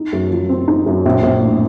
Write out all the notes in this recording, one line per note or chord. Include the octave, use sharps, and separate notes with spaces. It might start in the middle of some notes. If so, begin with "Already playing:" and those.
Already playing: D#4
F#2
F3
C4
D#4
F#2
A#1
A#1
A2